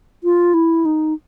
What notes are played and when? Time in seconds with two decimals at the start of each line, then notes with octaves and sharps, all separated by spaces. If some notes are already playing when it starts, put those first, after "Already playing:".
0.24 F4
0.54 E4
0.85 D#4